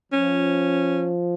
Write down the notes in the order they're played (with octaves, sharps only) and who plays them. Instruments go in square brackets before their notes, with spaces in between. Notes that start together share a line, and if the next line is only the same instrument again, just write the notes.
[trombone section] F3 [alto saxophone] C#4